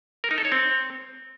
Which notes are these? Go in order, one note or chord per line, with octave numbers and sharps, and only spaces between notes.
A#4
D#4
A4
C#5
C4